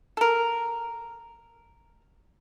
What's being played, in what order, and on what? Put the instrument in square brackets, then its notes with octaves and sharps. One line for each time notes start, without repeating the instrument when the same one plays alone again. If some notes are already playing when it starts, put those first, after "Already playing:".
[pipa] A4 A#4